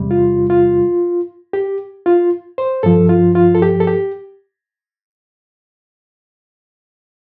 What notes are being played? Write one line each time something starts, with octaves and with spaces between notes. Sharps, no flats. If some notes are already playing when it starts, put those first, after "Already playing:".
Already playing: E2 C3 G3
F4
F4
G4
F4
C5
G2 F3 A4
F4
F4
A4
G4
A4
G4